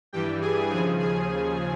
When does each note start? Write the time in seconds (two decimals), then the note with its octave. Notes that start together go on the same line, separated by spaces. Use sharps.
0.13 G2 E3 G3 G4 G5
0.42 G#4 G#5
0.70 D#2 C#3 F3 G#4 G#5
0.99 G#4 G#5